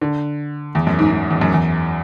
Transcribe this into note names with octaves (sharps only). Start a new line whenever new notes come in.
D3
E2
F#2
G#2
G#2
E2
F#2
E2